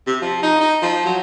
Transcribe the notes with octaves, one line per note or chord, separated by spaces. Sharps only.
C3
F3
D#4
D#4
F3
F#3